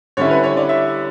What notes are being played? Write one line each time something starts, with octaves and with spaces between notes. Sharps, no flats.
D3 G3 C#4 E4 C#5
B4
C#5
D5
E5